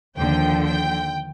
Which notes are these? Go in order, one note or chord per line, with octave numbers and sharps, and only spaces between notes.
D#2 D3 F3 G5
G5